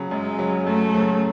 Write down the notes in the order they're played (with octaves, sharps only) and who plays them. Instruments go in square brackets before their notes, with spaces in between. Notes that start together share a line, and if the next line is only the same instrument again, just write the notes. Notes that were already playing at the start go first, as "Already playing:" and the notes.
Already playing: [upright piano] C#3 F#3
[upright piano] F#2 [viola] G#3
[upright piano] C#3 F#3
[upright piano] F#2 [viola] A3
[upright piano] C#3 F#3